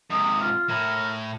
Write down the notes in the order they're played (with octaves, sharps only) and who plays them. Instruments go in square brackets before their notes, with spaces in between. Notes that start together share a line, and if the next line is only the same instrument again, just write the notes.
[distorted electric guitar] G#2 C3 [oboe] D#6
[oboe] F4
[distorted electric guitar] A2 [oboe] A#4